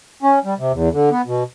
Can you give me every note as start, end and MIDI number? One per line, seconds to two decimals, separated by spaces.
0.23 0.39 61
0.45 0.54 55
0.59 0.72 48
0.72 0.89 40
0.93 1.09 50
1.11 1.22 59
1.26 1.43 47